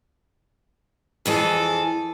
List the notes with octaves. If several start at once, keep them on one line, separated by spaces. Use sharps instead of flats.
F2 E3 G#4 A4